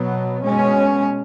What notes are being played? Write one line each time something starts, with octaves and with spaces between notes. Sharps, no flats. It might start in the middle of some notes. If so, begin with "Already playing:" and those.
Already playing: B2 F#3 B3
B2 G#3 C#4